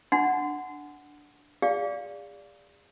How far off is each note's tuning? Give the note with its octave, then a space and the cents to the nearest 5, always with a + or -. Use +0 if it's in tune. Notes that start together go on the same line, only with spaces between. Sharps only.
D4 +0 F#5 +0 C6 -30
G#4 -40 D5 -15 F5 +0